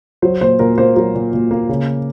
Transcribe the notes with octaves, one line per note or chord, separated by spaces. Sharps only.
F#3 C5
A#2 C5
A#2 A#4
A#3 C5
F#3 A#4
A#2
A#2
A#3
C#3